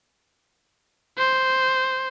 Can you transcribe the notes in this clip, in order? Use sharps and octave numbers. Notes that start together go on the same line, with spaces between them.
C5